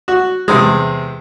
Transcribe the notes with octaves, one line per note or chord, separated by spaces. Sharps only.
F#4
E2 C3 G#3